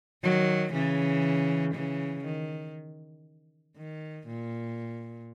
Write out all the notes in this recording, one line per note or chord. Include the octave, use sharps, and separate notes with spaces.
D#3 F#3
C#3 E3
C#3 E3
D#3
D#3
A#2